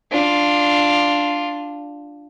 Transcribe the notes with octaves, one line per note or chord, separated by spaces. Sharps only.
D4 F4